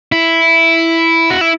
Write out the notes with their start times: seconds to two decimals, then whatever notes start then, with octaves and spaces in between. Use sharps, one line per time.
0.12 E4
1.30 F#4
1.41 E4